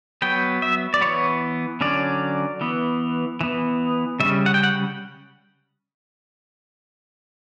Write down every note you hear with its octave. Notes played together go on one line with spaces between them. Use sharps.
F#3 B3 G5
E5
D5
E3 B3 C#5
D3 F#3 C#4 D5
E3 B3
E3 B3
C#3 G3 C#4 E5
F#5
G5
F#5